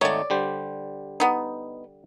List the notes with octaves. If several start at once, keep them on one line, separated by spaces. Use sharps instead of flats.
G#1 A3 D#4 C#5 D5
D3 G3 C5
B3 D#4